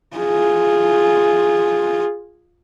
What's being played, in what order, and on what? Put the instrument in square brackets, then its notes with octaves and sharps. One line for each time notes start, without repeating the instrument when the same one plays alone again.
[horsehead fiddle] F4 G#4